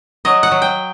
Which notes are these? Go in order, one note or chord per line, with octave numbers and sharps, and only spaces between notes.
F#3 D#5
F#5
F#3
G5